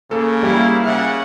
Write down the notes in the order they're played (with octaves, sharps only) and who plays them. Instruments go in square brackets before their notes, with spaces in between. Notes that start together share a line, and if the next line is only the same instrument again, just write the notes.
[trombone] C#3 [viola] A#3 [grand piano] A4
[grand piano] G3 [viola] A#3 E4
[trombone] C#3 [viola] F#5